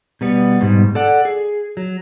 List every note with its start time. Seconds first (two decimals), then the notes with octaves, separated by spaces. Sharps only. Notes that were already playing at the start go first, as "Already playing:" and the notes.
0.21 B2 G3 B3
0.61 G#2 B2 G3
0.95 A4 D5 F#5
1.25 G#4
1.77 F#3